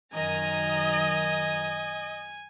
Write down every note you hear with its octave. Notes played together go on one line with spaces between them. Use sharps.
F#2 D#3 D#5 G#5 A#5